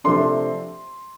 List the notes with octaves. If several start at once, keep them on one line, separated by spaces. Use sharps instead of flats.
C3 F3 A3 D4 C6